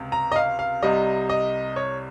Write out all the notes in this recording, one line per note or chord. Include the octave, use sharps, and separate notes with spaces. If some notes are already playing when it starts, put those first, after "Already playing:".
Already playing: C#2 C3
A#5
D#5
F5
F5
C2 C3 G3 D#5
D#5
C#5